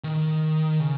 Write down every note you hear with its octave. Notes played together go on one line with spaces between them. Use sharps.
D#3
C#3